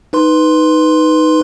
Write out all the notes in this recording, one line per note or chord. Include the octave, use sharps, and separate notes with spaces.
D#4 B4 C6